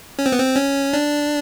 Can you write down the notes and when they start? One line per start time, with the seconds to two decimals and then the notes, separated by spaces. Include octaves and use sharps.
0.19 C#4
0.26 C4
0.32 B3
0.40 C4
0.56 C#4
0.93 D4